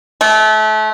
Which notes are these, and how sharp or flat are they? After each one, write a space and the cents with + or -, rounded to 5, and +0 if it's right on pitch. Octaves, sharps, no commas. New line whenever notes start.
A3 -30